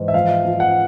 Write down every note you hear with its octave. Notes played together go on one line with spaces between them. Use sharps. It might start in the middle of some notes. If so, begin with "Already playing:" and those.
Already playing: G#2 E3
E5
F3 F5
F3
F#5